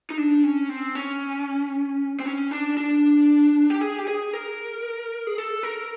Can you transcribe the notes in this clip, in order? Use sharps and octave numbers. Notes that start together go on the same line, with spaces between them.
D#4
D4
C#4
C4
C#4
C4
C#4
D4
D4
G4
G#4
G4
G#4
A#4
G#4
A4
A#4